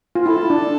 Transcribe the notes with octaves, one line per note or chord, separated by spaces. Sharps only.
F4
E4 A4
D4